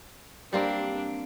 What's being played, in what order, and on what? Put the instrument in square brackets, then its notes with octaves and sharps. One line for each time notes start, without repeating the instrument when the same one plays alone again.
[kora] G3 A#3 C4 [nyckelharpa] D4